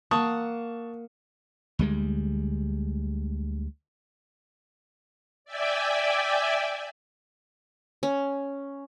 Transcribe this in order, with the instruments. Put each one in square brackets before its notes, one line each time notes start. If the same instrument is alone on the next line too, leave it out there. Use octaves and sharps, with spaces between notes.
[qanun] A#3 F#5 [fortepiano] A5 C#6 D#6
[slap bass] D2 G3 G#3
[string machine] D5 E5 G5 G#5
[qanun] C#4